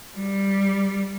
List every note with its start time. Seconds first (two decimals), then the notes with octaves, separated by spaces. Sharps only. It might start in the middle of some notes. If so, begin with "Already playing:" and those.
0.18 G3